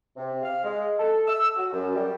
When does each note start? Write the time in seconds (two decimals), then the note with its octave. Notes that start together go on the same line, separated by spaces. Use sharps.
0.17 C3
0.43 F5
0.64 G#3
0.99 A4
1.27 E6
1.56 F#4
1.73 F#2
1.96 G3